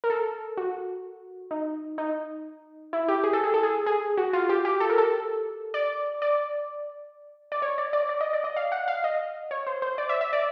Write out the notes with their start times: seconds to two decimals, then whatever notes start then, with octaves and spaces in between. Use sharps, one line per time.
0.04 A#4
0.10 A4
0.57 F#4
1.51 D#4
1.98 D#4
2.93 E4
3.08 G4
3.24 G#4
3.33 A4
3.44 G#4
3.54 A4
3.63 G#4
3.86 G#4
4.18 F#4
4.33 F4
4.49 G4
4.65 G4
4.80 A4
4.90 A#4
4.98 A4
5.74 D5
6.22 D5
7.52 D5
7.62 C#5
7.78 D5
7.93 D5
8.09 D5
8.21 D#5
8.33 D5
8.44 D#5
8.56 F5
8.72 F#5
8.88 F5
9.04 D#5
9.51 C#5
9.67 C5
9.82 C5
9.98 D5
10.09 E5
10.21 E5
10.33 D5